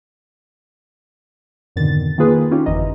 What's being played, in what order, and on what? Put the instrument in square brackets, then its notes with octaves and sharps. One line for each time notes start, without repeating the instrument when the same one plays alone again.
[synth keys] F2 G#2 B2 D3 D#3 A6
D#3 A#3 D#4 F4 G#4 B4
C#4 D#4 F4 G4
G1 F2 E3 D#5 A#5